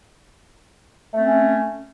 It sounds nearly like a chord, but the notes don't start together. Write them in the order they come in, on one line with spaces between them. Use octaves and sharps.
A3 C4 C#4